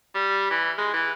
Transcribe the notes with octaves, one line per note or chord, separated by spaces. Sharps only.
G3
E3
G#3
E3